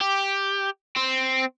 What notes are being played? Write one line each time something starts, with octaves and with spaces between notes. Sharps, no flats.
G4
C4